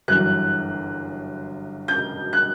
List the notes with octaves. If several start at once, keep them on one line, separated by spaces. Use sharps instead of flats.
G1 F#2 E3 F#6
G6
F#6